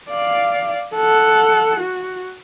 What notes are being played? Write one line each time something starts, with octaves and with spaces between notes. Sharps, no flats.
D5 F5
A4 F#5
F#4